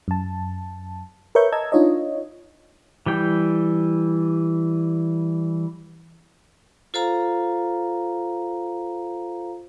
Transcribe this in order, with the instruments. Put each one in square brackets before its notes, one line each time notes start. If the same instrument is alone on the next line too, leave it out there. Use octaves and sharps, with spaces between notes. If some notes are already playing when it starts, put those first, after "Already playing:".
[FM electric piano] F#2 A5
A#4 B4 C#5 E5 C#6 G6
D#5 A5 A#5 E6 G#6
D4 D#4 F4 C#5 D#5
[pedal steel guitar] E3 G3 G5
[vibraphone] F4 A4 C5 F5 A#5